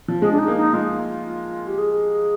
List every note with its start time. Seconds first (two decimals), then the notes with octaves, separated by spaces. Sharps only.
0.08 F3
0.21 G#3 G#4
0.31 D4
0.38 D#4
0.48 A#3
0.56 D#4
0.73 G#3 F4
1.67 G4
1.78 G#4